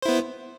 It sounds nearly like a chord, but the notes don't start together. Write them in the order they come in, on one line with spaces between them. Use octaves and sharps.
C5 E4 B3